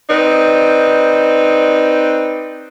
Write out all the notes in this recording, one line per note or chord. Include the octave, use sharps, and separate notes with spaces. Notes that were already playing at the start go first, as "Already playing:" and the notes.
C4 D#4 B4 D5